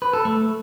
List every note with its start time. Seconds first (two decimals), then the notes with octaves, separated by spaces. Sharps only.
0.02 B4
0.13 A4
0.25 A3